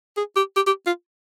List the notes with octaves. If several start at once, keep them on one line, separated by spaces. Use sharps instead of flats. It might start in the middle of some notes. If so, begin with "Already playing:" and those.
G#4
G4
G4
G4
F4